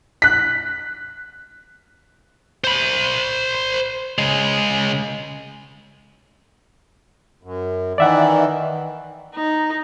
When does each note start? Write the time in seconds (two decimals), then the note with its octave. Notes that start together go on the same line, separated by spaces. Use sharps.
0.22 F#6 B6
2.64 C5 B5
4.18 C#3 G#3
7.43 F#2
7.98 D#3 E3 D5 E5 F#5
9.35 D#4